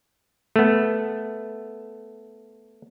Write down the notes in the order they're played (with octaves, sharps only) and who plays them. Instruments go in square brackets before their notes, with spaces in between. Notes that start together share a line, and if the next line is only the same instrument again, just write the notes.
[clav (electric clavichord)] A3 B3